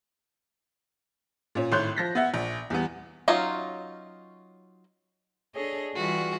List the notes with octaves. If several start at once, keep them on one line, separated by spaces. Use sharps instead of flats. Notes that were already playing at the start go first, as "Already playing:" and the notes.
A#2 C#4
G#1 A2 C#5 C6 F#6 G6
F3 A#6 B6
B3 E5 F#5
A#1
E2 G3 B3
F#3 C#4 D#4 F4
D4 G#4 A4 C#5 D#5
E3 G3 F4 F#4 G#4